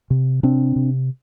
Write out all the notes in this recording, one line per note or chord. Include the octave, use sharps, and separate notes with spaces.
C3
C3 C4 D4
C3